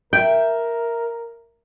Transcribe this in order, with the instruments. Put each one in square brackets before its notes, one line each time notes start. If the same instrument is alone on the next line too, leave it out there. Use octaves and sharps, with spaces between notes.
[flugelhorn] A#4 [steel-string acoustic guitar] E5 [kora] G5